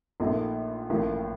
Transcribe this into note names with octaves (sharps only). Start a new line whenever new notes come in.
A#1 A#2 A3 D#4
A1 A2 F3 A#3